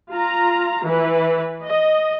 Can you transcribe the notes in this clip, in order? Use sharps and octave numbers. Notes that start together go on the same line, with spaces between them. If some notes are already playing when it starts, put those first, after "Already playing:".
F4 A#5
E3 B4
D#5